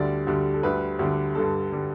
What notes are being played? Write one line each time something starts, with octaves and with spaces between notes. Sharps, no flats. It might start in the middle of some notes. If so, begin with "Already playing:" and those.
Already playing: D2 D3 G3 D5
D2 D3 G3
A4
D2 D3 G3 B4
D2 D3 G3 G4
G2 D3 G3 A4
D3 G3